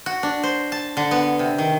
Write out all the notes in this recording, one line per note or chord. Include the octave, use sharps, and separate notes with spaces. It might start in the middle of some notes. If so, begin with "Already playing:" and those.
F#4
D4
C5
A5
D3
B3
C3
D#3